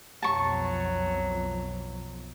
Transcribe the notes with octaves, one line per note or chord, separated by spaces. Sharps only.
B1 F2 F#3 A5 C#6